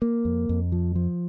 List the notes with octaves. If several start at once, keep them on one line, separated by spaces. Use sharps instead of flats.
A#3
F2
F2
F3
F3